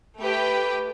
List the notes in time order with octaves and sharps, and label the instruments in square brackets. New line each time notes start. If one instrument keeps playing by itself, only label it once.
[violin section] A3 G4 B4 G5